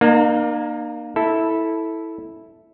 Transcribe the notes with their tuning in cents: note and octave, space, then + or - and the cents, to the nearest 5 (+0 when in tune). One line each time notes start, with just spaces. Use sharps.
A#3 +10 D#4 -40 F5 +40
E4 -10 A4 +0